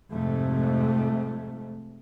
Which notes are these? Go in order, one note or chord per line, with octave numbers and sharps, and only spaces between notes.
F2 G#2 C3 A3